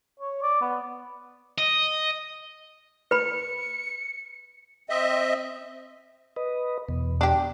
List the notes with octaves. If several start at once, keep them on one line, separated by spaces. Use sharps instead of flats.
C#5
D5
B3
D#5
B4 B5 C#7
C4 D#5 E5
B4 D#5
E2 B2
D4 G4